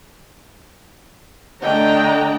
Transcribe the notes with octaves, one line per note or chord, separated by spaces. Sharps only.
D3 A3 D4 D#5 G5 A#5